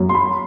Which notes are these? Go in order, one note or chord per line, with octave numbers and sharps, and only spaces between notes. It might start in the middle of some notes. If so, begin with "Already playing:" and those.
Already playing: F#2
C6
B5